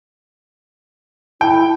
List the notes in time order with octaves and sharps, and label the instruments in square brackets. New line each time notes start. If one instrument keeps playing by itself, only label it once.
[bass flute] E4 [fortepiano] G5